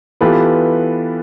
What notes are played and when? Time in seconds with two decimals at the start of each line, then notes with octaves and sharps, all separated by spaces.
0.21 E3 B3 F4 G4 A4 B4